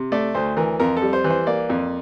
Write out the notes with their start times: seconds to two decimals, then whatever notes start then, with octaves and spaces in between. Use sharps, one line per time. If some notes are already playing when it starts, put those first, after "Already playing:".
Already playing: C3
0.12 A3 D5
0.35 D2 C5
0.57 E3 A#4
0.80 F2 A#4
0.97 A4
1.02 G3
1.13 C5
1.24 E3
1.30 C5
1.47 A#3 D5
1.70 F2